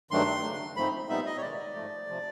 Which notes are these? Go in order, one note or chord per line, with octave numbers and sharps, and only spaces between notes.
G2 D#3 F#3 A3 D4 C6
C#3 F#3 A3
G#2 F3 A3 C4 D#4 B5
A#2 G3 B3 D#4 E5
D#5
C#5
C3 D#3 G#3 D5
G#2 F3 A3
C3 F3